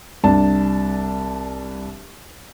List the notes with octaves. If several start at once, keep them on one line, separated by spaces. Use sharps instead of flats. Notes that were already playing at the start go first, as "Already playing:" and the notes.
C2 D4 A5